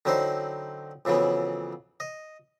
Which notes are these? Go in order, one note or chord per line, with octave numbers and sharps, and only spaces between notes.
D3 F#3 C4 D#4 E4 C5
F2 C#3 E3 F#3 B3
D#5